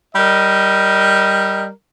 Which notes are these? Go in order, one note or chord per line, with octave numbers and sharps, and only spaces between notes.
G3 A#4 D#5